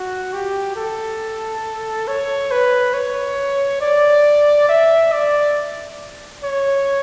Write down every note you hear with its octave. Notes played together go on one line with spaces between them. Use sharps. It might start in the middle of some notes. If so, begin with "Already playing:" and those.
Already playing: F#4
G4
A4
C#5
B4
C#5
D5
E5
D5
C#5